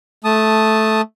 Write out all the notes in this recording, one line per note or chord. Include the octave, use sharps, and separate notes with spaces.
A3 A5 D#6